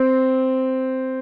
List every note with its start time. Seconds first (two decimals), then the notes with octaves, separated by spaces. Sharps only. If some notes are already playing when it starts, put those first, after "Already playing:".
Already playing: C4